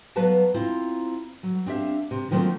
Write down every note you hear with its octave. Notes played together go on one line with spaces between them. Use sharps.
F#3 B3 B4 F5 A5 A#5
C4 E4 F4 A#5
F#3
C4 D4 G4 E5 F5
C3
D#3 F3 F#3 A3 A#3 C4